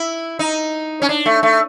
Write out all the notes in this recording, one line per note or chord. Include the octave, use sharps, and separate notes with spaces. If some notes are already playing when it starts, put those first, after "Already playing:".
Already playing: E4
D#4
C#4
D4
A3
A3